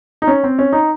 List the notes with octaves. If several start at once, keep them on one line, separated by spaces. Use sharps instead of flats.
D#4
C#4
C4
C#4
D#4